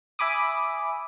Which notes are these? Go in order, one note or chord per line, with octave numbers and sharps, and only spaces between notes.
E5 G#5 B5 D6 D#6